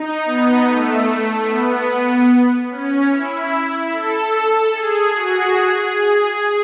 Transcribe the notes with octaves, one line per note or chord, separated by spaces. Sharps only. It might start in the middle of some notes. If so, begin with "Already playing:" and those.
Already playing: D#4
B3
A3
B3
C#4
E4
A4
G#4
F#4
G#4